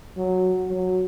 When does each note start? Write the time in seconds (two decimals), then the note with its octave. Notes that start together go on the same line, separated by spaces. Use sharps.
0.17 F#3
0.68 F#3